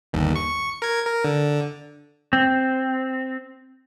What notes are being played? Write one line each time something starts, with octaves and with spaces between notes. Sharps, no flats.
G1 D#2
C#6
A#4 G#6
A#4
D3
C4